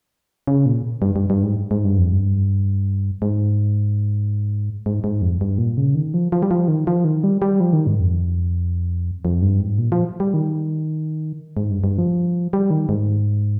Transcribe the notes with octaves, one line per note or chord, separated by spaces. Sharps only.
C#3
A#2
G2
G2
G2
G#2
G#2
G2
F2
G2
G#2
G#2
G#2
F2
G2
A#2
C#3
D#3
F3
F3
G3
F3
D#3
F3
D#3
G3
G3
F3
D#3
G#2
F2
F2
G2
G#2
A#2
F3
G3
D#3
G#2
G2
G2
F3
G3
D#3
G#2